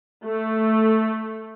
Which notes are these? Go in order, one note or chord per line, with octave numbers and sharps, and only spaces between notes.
A3